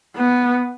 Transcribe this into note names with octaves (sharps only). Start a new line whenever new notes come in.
B3